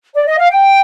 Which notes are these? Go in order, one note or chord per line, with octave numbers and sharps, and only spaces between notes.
D5
D#5
F5
G5